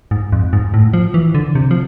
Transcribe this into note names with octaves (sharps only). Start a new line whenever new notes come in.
G#2
F2
G#2
A2
F3
E3
D3
C3
F3